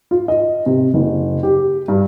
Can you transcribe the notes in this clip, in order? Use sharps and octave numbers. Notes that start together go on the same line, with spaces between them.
F4
D#5
C3
F#1
G4
G2